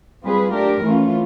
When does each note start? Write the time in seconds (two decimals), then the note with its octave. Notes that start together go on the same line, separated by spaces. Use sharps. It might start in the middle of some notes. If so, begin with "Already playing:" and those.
0.23 G3 C4 F4 G#4 B4
0.52 A3 D4 G4 A#4
0.81 E3 A3 C#4 F4